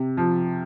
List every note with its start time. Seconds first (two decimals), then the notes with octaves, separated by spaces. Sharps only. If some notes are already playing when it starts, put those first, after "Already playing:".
Already playing: C3
0.17 F3